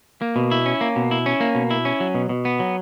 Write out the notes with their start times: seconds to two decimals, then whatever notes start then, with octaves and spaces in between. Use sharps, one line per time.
0.22 A#3
0.36 B2
0.51 E4
0.66 C#4
0.81 A#3
0.96 B2
1.11 E4
1.26 C#4
1.40 A#3
1.55 B2
1.71 E4
1.85 C#4
2.00 F#3
2.14 B2
2.29 B2
2.45 B3
2.60 F#3